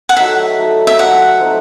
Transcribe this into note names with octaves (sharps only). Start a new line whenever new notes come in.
F#5
F#3 A3 D#4 E5
F#3 A3 D#4
E5
F#3 A3 D#4 F#5
F#3 A3 C4 D#4